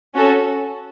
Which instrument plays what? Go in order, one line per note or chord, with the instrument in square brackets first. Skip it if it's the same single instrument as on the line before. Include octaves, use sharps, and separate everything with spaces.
[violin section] C#4 F#4 A4